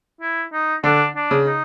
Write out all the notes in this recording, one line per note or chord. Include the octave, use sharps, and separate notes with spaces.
E4
D#4
D3 D4
D4
C#3
D#4